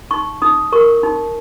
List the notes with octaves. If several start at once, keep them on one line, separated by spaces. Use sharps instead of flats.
D#4 C#6
D#4 D#6
A#4 C#6
D#4